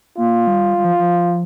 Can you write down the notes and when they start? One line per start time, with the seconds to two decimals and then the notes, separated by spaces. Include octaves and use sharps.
0.18 A#3 F4
0.47 G3
0.78 G3
0.85 F3
0.99 F3